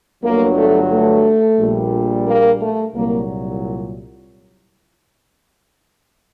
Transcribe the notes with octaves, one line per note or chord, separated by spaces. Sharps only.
G1 G2 F#3 A#3
A3
A3
A#1 A#2 G3
A#3
A3
C2 A#2 F#3 A#3